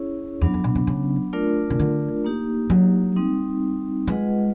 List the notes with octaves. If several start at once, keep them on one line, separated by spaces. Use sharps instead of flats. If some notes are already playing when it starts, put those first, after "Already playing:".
Already playing: C#4 E4 G#4 C#5
E2 F#3 B3 D4
F2
B2
C3
C#3
A3 D4 F4 A#4 D5
C#3
D3
A#3 D#4 G4
F#3
G3 C4 D#4
G#3 F4 G#4 B4 D#5 F#5